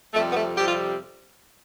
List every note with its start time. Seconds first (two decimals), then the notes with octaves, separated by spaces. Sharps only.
0.13 F2 C3 G3 A3
0.28 B3
0.34 A3
0.55 F2 C3 G3 G4
0.66 F4